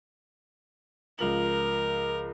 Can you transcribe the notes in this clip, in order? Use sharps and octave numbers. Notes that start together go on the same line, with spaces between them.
C#2 F3 A#4 F#7